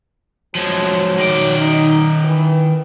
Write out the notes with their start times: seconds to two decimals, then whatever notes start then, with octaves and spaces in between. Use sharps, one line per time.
0.55 F3 F#3 G#3
1.18 D#3 D5
1.58 D#4
2.24 E3